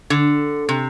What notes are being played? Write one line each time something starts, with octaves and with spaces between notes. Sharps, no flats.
D3
C3